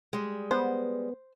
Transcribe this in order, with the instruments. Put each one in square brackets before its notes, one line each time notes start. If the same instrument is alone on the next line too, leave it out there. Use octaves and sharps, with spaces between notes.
[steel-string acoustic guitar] G3 G#3
[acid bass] B3 [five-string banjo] C5